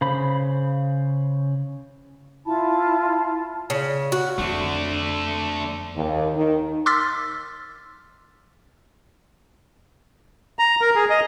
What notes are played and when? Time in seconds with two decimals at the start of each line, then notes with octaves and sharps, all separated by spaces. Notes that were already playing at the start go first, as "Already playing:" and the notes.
0.01 C#3 C5 B5
2.46 E4 F4 A5 B5
3.70 C#3
4.12 F#4
4.39 F2 A3 D4
5.96 D#2
6.35 D#3
6.86 C6 D6 E6 F6 A6 B6
10.59 A#5
10.81 A#4
10.96 G#4
11.10 D#5